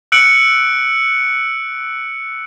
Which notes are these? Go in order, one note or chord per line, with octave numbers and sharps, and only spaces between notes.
E6 F#6 C#7 D7 F#7